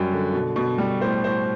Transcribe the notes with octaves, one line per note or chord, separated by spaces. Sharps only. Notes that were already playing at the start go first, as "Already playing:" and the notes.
Already playing: F#2 G3
D3
B2
B2
G3
A2 C5
A2 C5